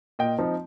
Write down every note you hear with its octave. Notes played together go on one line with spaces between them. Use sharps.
A#2 D#5 G5
F3 C4 D#4